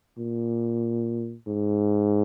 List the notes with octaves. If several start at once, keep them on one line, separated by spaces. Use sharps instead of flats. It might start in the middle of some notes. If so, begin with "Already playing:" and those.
A#2
G#2